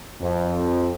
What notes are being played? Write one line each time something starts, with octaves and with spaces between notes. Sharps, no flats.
F2